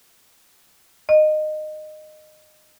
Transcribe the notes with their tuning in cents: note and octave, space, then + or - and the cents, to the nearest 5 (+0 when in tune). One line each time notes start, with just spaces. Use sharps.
D#5 -20